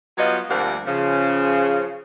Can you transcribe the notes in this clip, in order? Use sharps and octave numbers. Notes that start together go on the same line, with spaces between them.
F#3 G3 B3 F4 D#5
D2 F3 G3 A#3 C4 F#5
C#3 F3